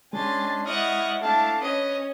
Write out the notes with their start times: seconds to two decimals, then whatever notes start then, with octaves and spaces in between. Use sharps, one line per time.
0.13 G#3 C#4 D4 G#5 C6 A6
0.66 E4 D5 D#5 F#5 C#6 D#6 F6
1.22 A3 D4 E4 F5 A5 A6
1.61 C#4 B4 D#5